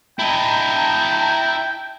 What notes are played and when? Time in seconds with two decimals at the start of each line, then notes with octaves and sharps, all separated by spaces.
0.19 E4 D#5 G5 A5 A#5